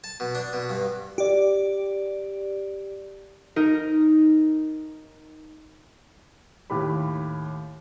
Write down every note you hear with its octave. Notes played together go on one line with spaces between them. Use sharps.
A5
B2
D4
B2
G2
G4 D5
D#4 A#4
D#2 A2 G4 B5